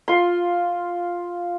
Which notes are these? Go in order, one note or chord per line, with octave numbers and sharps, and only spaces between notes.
F4 C6